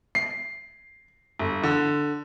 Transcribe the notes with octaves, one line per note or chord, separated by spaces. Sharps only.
C7
G1
D3